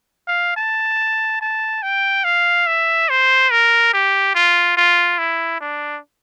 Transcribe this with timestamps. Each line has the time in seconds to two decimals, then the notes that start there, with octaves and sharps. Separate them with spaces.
0.28 F5
0.56 A5
1.41 A5
1.82 G5
2.24 F5
2.67 E5
3.09 C5
3.51 A#4
3.93 G4
4.35 F4
4.77 F4
5.19 E4
5.61 D4